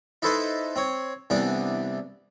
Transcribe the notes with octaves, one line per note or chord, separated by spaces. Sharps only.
D#4 E4 A4 B4 C5 D#5
C4 C#5
C2 E3 B3 D4 D5